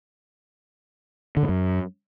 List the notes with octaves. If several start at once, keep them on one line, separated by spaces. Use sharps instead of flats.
D3
A2
F#2